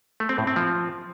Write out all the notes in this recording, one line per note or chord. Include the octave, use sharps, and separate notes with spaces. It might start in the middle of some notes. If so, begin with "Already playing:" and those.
A3
C4
A2
C4
F3